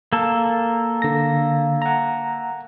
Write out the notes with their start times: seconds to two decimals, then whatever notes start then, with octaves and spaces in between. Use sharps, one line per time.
0.13 A#3 A4
1.02 D3 A#6
1.82 F#5 A#5